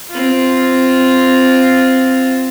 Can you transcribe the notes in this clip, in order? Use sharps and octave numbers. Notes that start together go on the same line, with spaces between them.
C4 F4